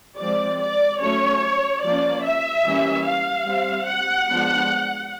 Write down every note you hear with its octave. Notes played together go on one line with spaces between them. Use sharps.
F3 G#3 C4 D5
D5
F#3 A3 C#4 C#5
F3 A#3 C#4 D5
E5
E3 G3 A#3 C#4
F5
G3 C4
F#5
F3 G#3 B3 D4